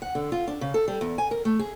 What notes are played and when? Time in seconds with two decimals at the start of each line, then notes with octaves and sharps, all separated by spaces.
0.02 F#5
0.15 D3
0.32 F4
0.48 D4
0.61 C#3
0.74 A4
0.88 G3
1.01 E2
1.18 G#5
1.31 A#4
1.45 A3
1.59 G#4